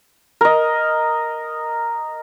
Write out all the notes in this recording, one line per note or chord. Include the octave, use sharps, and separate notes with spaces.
A#4 D#5